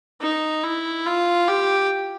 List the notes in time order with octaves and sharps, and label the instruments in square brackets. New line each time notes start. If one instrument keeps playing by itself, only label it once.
[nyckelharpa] D#4
E4
F4
G4